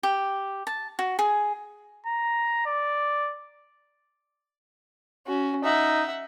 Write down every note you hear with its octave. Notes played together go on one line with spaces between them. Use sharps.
G4
A5
F#4
G#4
A#5
D5
C#4 F#4
D#4 E5 F#5